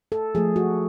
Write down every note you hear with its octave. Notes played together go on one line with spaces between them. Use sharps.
A4
F3 A3 G#4
F#4